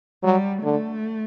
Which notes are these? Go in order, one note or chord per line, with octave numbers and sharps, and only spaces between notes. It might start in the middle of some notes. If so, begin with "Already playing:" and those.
F#3 G3
D3 A3